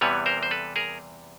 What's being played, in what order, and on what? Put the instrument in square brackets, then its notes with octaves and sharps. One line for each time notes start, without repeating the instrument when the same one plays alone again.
[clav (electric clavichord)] E2 C3 E3 G3 B3 B4 C#5
A#4 C5
C5
A4 B4
G#4 A#4